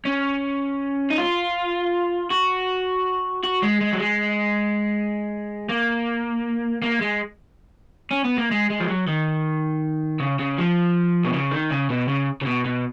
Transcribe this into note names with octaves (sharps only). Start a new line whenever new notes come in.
C#4
D#4
F4
F#4
F#4
G#3
G#3
F#3
G#3
A#3
A#3
G#3
C#4
B3
A#3
G#3
G#3
F3
F#3
D#3
C#3
C#3
F3
B2
C#3
D#3
C#3
B2
C#3
C#3
B2
B2